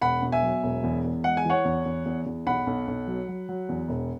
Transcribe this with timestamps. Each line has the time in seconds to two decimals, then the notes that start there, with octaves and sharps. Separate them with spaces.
0.01 E1 F#5 B5
0.22 B2
0.32 E5 G#5
0.43 F#3
0.63 E1
0.83 E2
1.04 E2
1.24 G#3 F#5
1.37 G#5
1.45 E3 C#5 F#5
1.65 E2
1.85 E2
2.06 E2
2.26 E2
2.46 B1 F#5 B5
2.67 B1
2.87 B1
3.07 F#3
3.28 F#3
3.49 F#3
3.69 E2
3.89 E1